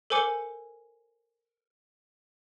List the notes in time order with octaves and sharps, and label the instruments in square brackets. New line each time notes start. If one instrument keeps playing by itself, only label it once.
[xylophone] A4 A#4 C5 G#5 D6 C#7